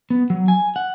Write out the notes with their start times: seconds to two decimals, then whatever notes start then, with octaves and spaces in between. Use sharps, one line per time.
0.10 B3
0.30 F#3
0.48 G#5
0.76 F#5